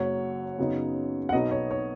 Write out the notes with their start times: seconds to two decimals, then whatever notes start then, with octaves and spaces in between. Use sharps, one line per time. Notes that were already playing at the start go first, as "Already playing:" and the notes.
Already playing: F#1 F#2 F#3 C#5 F#5
0.58 F#2 C#3 B3 D#4
1.29 F#5
1.33 B1 B2 B3 D#4 D#5
1.51 C#5
1.71 C#5